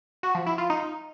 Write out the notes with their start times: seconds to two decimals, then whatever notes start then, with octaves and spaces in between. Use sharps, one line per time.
0.23 F#4
0.35 F3
0.46 E4
0.58 F4
0.70 D#4